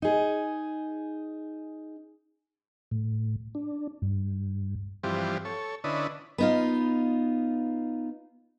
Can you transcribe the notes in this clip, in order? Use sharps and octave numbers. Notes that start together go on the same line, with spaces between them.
D#4 G#4
A2
D4
G2
G2 E3 F3 C4 G4
A4 C#5
D3 C#4 D4 E4 B4 D#5
B3 D#4 F4